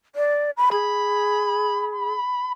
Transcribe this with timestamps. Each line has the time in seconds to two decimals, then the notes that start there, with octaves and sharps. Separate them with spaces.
0.15 D5
0.57 B5
0.72 G#4 B5